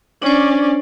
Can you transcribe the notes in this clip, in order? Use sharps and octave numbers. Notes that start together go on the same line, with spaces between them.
C#4 D4 C5 D5